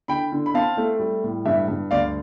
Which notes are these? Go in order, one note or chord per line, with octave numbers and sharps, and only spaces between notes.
D3 G5 B5
D3
B5
C4 F5 A5
A3
G3
A2
G2 E5
G2
D2 D5 F5